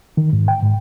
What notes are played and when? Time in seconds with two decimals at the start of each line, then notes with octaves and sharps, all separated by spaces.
0.17 D#3
0.33 G#2
0.48 G5
0.63 G#2